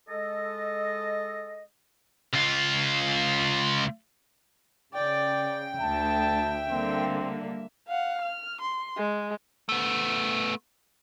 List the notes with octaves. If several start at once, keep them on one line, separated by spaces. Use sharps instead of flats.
G#3 A4 D#5
C#2 F4
C#3 D5 G5
D2 E5 A5
D3 G3 A#3 C4
F5 F#5
F6
C6
G#3
A3 B3